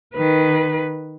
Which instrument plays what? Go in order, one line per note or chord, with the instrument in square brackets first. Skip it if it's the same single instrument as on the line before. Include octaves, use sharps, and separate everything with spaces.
[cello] D#3 B4